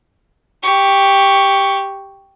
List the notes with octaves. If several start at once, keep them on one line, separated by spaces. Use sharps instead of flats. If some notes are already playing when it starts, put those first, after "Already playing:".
G4 C#6